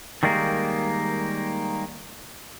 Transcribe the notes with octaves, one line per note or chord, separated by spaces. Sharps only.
D#3 G3 G#3 A#3